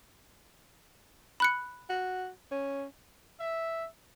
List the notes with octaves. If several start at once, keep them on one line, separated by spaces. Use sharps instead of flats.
B5 F#6 C#7
F#4
C#4
E5